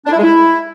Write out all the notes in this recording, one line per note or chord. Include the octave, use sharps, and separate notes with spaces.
D4
E4
G#3
E4